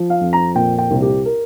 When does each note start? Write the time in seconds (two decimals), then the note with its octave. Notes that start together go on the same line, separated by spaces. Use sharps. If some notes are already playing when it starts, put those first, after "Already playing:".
Already playing: F3
0.10 F5
0.21 F2
0.33 A#5
0.55 A#2 G5
0.78 G5
0.91 C2
1.02 G4
1.26 A#4